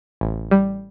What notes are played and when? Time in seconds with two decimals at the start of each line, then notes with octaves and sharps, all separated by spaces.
0.21 A1
0.51 G3